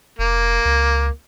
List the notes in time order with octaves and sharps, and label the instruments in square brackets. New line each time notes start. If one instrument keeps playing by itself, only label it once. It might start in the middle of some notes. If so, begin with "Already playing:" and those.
[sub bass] F1 [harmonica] A#3
[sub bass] C#2